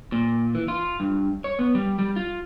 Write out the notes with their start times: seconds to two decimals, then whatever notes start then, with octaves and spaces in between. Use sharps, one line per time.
0.12 A#2
0.55 E3
0.68 F4
1.00 G2
1.44 C#5
1.59 B3
1.75 G3
1.99 G3
2.16 F4